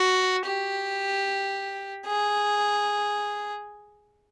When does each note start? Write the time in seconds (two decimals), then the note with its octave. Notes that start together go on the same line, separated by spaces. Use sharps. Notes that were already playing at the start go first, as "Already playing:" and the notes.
Already playing: F#4
0.45 G4
2.06 G#4